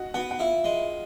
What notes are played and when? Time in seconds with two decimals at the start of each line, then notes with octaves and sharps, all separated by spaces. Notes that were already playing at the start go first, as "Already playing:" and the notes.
Already playing: F#4 D#5 F#5
0.14 B3 F#4 F#5
0.31 F#5
0.39 E4 F4 F5
0.64 G#3